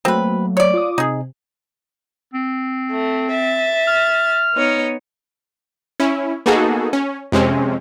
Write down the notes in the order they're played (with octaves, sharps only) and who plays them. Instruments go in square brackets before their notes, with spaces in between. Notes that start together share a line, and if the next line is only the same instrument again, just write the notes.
[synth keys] F#3 A3 A#3 [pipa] C4 B4
[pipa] C#5 D5
[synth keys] F4 D6 D#6
[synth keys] C3 [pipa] D#4 G#4
[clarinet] C4
[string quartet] A3
E5 A6
[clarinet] F6
[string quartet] B3 D#4 C#5
[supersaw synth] C#4 E4
A#3 B3 D#4 F#4 G#4 A4
C#4
F2 C3 G#3 C4 C#4